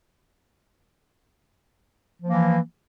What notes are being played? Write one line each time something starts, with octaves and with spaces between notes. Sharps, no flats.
E3 F3 A#3